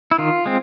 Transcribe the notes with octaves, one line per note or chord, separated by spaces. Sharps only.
E4
D#3 F4
G#3 C4